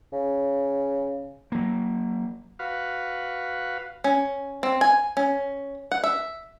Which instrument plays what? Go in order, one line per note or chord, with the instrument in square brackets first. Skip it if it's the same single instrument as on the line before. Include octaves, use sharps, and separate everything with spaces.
[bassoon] C#3
[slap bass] F#3 A#3
[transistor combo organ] F#4 B4 F5
[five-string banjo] C#4
C4
G#5
C#4
F#5
E5